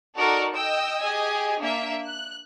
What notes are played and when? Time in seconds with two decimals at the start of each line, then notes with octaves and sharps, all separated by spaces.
0.16 D#4 F#4 A4 A#4 D5 D#5
0.53 D#5 G5 E6
1.02 G4 G#4 D#5 G#5
1.60 A#3 D4 E5
2.05 F#6